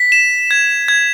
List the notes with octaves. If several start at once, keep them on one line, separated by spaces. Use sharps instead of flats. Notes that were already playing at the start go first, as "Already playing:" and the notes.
Already playing: B6
E7
G#6
G#6